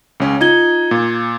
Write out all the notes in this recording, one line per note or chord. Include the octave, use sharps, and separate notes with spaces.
C#2 C#4
D#4 F4 G#6 G7
A#2